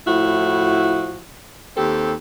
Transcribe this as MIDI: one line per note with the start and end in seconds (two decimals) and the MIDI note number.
0.07 1.22 45
0.07 1.22 53
0.07 1.22 64
0.07 1.22 66
1.77 2.13 39
1.77 2.13 60
1.77 2.13 67
1.77 2.13 69